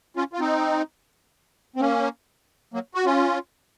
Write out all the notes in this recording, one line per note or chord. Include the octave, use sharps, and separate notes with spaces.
C#4 F4
F4
C4 D#4
C4
A#3 C#4
F#3 A#3
F#4
C#4 F4